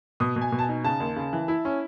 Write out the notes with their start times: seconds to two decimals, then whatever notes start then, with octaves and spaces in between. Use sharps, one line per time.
0.20 B2 D#6
0.36 B2
0.41 G#5
0.52 B2
0.59 A5
0.63 G#5
0.69 D#4
0.84 C#3 A5
1.00 D#2
1.16 C#3
1.33 E3
1.48 E4
1.65 C#4